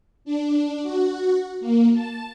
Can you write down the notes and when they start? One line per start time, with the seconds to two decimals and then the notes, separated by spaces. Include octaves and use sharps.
0.25 D4
0.83 F#4
1.61 A#3
1.93 A5